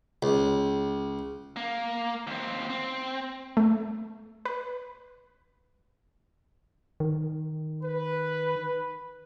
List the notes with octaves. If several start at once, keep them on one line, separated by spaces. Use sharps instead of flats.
C#2
A#3
D#2 C4
C4
A3
B4
D#3
B4